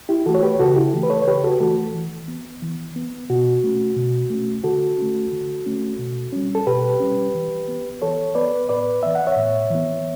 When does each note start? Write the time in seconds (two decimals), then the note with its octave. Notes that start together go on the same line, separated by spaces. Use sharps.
0.09 E4 G4
0.26 E3 A3 F#4 A4
0.34 C#5
0.43 G4 B4
0.60 C#3 F#4 A4
0.76 E4 G4
0.94 E3 A3
1.03 B4
1.10 A4 C#5
1.22 C#5
1.27 C#3 G4 B4
1.44 F#4 A4
1.60 E3 A3 F#4 A4
1.94 E3
2.28 B3
2.62 E3
2.96 B3
3.30 B2 F#4
3.64 A3 C#4
3.97 B2
4.30 A3 C#4
4.64 D3 F#4 A4
4.98 A3 C#4
5.32 D3
5.66 A3 C#4
5.99 B2
6.32 G3 C#4
6.55 A4
6.67 B2 G4 B4
7.00 G3 C#4
7.35 E3
7.68 B3
8.02 E3 A4 C#5
8.35 B3 B4 D5
8.69 A2 B4 D5
9.03 E3 B3 E5
9.15 F#5
9.27 C#5 E5
9.36 A2
9.70 E3 B3